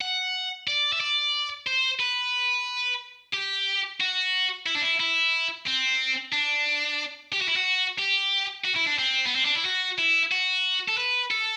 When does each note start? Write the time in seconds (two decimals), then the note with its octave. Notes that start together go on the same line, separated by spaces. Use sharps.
0.01 F#5
0.68 D5
0.93 E5
1.01 D5
1.67 C5
2.00 B4
3.33 G4
4.00 F#4
4.66 E4
4.75 D4
4.82 E4
5.00 E4
5.66 C4
6.33 D4
7.32 G4
7.41 F#4
7.48 E4
7.56 F#4
7.99 G4
8.65 F#4
8.76 E4
8.87 D4
8.99 C4
9.26 B3
9.35 C4
9.45 D4
9.55 E4
9.65 F#4
9.98 E4
10.32 F#4
10.89 A4
10.98 B4
11.31 A4